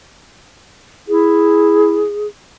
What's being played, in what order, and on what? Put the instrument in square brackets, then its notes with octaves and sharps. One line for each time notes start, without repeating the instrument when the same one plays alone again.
[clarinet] E4 [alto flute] G#4